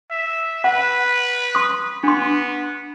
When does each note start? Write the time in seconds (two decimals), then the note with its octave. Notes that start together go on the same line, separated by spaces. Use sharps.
0.11 E5
0.64 B4 F#5
1.55 C6 D#6
2.03 B3 D4 C6